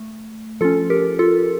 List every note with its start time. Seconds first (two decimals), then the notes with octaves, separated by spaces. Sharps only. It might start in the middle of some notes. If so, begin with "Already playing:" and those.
Already playing: A3
0.61 F3 C#4 F4 A4
0.90 G4 A#4
1.19 F4 A4